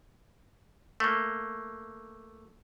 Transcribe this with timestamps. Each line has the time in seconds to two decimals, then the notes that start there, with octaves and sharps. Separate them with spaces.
1.00 A3 A#3